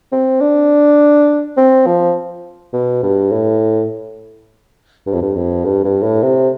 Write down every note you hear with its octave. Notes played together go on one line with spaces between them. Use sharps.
C4
D4
C4
F3
B2
G2
A2
G2
F2
G2
F2
G2
G2
A2
C3